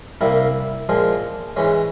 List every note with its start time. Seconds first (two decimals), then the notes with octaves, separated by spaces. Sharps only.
0.21 C2 C3 G3 A#3 E4
0.89 A#2 F3 G#3
1.56 G#2 E3 G#3 C#4